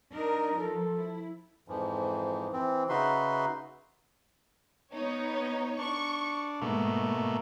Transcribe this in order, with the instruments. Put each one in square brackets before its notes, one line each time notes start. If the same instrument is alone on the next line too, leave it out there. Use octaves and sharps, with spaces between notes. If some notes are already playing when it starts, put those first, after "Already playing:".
[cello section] D4 A#4 [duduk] D#4
[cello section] F3 [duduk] A4
[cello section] E4
[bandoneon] F2 G#2 E3 F3
E3 C4
C#3 D#4 F#4 B4 E5 C6
[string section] B3 D#4 C#5
[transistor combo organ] D4 [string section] C#6
[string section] G#2 [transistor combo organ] B2 A3 A#3